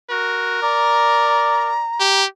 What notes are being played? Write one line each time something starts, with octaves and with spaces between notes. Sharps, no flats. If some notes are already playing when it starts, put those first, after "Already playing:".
F#4 A#4
D5 A#5
G4